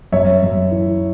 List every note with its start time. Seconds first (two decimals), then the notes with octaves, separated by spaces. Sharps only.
0.12 F#2 C#5 E5
0.43 F#2
0.71 E3